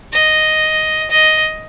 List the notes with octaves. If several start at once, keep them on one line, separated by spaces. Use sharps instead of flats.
D#5
D#5